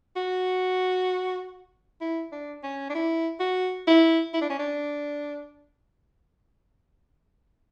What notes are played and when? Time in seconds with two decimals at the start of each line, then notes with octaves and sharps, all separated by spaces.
0.16 F#4
2.01 E4
2.32 D4
2.63 C#4
2.89 D4
2.95 E4
3.40 F#4
3.87 E4
4.34 E4
4.41 D4
4.50 C#4
4.59 D4